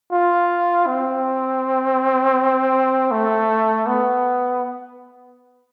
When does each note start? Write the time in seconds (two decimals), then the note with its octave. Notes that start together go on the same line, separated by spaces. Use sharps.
0.12 F4
0.87 C4
3.11 A3
3.87 B3